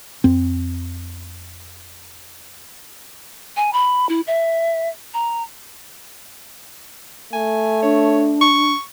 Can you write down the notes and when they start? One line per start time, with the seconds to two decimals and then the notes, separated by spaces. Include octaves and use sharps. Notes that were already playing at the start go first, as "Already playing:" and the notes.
0.24 F2 C4
3.56 G#5
3.73 B5
4.09 E4
4.27 E5
5.14 A#5
7.33 A3 G#5
7.83 D4 C#5
8.41 C#6